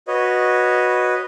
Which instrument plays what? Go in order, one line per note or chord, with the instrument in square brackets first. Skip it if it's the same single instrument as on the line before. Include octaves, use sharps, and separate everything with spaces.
[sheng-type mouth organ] F#4 B4 C#5 D#5